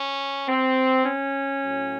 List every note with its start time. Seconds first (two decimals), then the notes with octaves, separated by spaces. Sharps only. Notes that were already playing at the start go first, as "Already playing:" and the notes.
Already playing: C#4
0.49 C4
1.06 C#4
1.64 A2 F#3